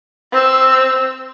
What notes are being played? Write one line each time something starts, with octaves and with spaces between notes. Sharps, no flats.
C4 E6